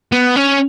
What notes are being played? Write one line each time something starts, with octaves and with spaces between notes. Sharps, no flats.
B3
C#4